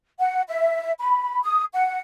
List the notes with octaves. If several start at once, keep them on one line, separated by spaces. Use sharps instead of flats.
F#5
E5
B5
D#6
F#5